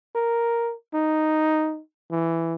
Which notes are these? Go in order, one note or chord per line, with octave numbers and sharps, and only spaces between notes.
A#4
D#4
E3